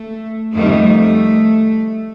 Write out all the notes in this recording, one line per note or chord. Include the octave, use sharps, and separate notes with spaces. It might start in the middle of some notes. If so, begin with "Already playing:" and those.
Already playing: A3
F2 D#3 G3 A3